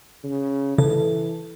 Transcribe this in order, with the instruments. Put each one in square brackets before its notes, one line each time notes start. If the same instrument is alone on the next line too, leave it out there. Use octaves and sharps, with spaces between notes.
[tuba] C#3
[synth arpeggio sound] C#3 [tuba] E3 [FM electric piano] A4